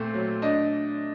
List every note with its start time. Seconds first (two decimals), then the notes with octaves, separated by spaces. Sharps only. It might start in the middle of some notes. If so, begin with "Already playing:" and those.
Already playing: A#2 A3 C4
0.14 F#3
0.42 D4 D#5